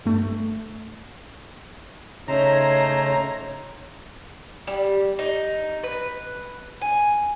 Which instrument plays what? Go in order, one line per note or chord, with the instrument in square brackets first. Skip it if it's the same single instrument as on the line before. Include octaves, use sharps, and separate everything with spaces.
[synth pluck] G2 A3
[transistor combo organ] C#3 A#5 [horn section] A3 D#4 C5 [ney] C#5
[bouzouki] G3
D#4
B4
G#5